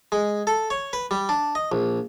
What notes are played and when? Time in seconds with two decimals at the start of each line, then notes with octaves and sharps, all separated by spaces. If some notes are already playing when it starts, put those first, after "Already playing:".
0.12 G#3
0.47 A4
0.70 C#5
0.93 B4
1.11 G3
1.29 D4
1.55 D#5
1.72 A#1